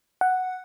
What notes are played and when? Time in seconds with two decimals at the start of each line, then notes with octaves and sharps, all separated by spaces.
0.21 F#5